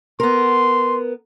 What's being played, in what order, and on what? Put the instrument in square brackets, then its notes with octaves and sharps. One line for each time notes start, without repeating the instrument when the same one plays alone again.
[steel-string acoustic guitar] B3 A#4 [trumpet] C6